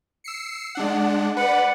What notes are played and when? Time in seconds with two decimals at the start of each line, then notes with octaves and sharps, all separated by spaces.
0.24 E6 C7 C#7
0.75 G#3 D4 F#5
1.37 B4 D5 F#5